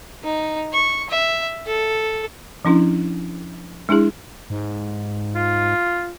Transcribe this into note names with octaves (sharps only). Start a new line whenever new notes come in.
D#4
C#6
E5
A4
F3 C#4 D4 E4
G#3 D4 E4 G#4
G#2
F4